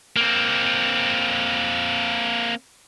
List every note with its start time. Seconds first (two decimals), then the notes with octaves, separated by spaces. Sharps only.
0.16 A#3 C4